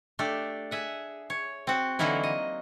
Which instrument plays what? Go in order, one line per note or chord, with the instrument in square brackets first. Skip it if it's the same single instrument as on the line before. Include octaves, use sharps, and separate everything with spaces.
[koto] A3 D4 G4 A4
G#4 E5 F#5
C#5
C4 F#4
D3 E3 F#3 A#3 D#4 E4
D#5